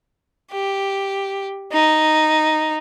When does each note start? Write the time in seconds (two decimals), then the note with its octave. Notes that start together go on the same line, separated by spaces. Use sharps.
0.52 G4
1.72 D#4